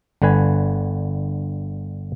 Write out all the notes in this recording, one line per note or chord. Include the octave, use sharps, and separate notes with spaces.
G1 D3 B4 G#5